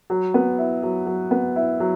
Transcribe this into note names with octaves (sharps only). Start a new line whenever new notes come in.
F#3
B3
E4
F#3
F#3
B3
E4
F#3